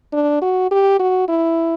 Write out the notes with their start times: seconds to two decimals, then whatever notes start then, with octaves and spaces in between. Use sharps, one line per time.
0.13 D4
0.42 F#4
0.71 G4
1.00 F#4
1.28 E4